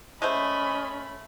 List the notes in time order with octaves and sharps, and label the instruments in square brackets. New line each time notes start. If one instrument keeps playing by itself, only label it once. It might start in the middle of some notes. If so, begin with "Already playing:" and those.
[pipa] G#3 A3 C5 [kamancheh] C#4 B5 [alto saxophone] D#5